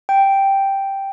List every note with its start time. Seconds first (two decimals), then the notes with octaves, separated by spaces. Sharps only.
0.09 G5